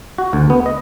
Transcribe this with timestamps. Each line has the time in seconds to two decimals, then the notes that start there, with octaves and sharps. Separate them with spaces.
0.18 F#4
0.33 D2
0.50 B3
0.66 D#5